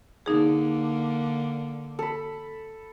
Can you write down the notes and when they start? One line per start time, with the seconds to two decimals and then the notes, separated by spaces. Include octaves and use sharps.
0.26 D3 A#3 D#4 G#4
1.99 A4 B5